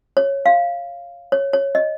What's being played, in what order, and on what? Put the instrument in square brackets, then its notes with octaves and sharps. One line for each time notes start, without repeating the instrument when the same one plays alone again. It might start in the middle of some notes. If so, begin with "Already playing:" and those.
[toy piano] C#5
F5
C#5
C#5
D#5